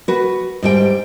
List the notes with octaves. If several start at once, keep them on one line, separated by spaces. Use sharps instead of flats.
F#4 B4
G#2 G3 G5